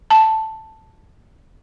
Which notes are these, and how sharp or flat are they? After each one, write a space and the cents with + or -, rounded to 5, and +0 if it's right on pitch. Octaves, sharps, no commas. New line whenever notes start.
A5 +5